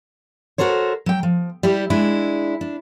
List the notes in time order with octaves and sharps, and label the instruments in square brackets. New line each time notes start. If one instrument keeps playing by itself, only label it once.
[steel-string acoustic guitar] F#4 A4 A#4 C5 C#5
F#3 G5
F3
G3 E4 G4
G#3 D4 E4
D4